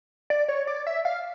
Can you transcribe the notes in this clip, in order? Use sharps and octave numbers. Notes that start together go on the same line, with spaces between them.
D5
C#5
D5
E5
F5